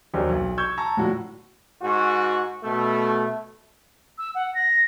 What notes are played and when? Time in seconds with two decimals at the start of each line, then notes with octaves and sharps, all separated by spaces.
0.14 D#2 F#3 D4 C5 G#5
0.29 B1
0.58 C#6 E6 G6 G#6
0.77 A5 A#5 C#6 E6
0.97 A2 D3 F3 F#4
1.82 G#2 F#4
2.64 B2 A3
4.18 E6
4.35 F#5
4.55 A#6